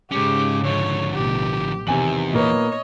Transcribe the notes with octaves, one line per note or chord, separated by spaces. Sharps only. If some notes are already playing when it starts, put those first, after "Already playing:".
G#2 C#3 G#3 C#4 G4 D6
D3 F3 C#5
A1 B2 G4
E2 C3 D#3 G#5 F#7
A#2 A#3 B3 C#5 D#5